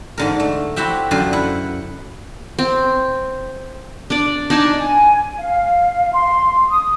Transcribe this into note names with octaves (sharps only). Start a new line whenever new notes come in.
G#2 D3 A#4
A3
C4 E4 F#4 G4 E5 G5
F#2 D3 F4 C5 C6
E4 F#5
C4
D4 D5
D4 D#4 G#5 A5
G#5
F5
C6
D#6